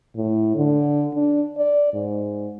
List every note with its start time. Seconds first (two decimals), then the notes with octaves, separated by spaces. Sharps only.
0.16 A2
0.56 D3
1.15 D4
1.57 D5
1.93 G#2